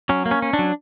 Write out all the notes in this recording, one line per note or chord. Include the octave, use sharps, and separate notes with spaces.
F#3 C#4
A#3
C#4
C#4
D4
F#3